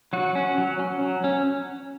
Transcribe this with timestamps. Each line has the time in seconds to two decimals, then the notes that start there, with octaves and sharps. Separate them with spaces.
0.13 F#3 F#4
0.35 C#4
0.58 F#3
0.79 C#4
1.01 F#3
1.24 C#4